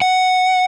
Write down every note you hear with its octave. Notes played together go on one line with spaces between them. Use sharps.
F#5